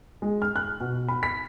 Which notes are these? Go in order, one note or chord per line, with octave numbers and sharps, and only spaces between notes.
G#3
F6
F#6
B2
B5
B6